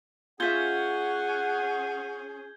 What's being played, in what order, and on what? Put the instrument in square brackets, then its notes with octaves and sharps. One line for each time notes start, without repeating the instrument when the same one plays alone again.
[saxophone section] C#4 G#4 [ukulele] F4 E5 [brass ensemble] F#5 [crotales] G6 G#6 G7